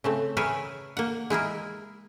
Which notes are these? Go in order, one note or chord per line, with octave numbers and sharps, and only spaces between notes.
C#3 A3 C4
G#4 A#4 B4 C#5 E5 G#5
A#3 F#5
G#3 E4 G#4 A#4